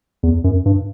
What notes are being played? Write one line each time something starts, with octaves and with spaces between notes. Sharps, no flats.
E2
F#2
G2